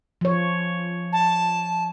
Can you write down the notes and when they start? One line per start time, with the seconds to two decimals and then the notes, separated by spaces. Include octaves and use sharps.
0.21 F3 C#5
1.13 A5